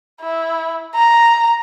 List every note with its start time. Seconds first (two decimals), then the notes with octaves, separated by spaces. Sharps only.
0.21 E4
0.95 A#5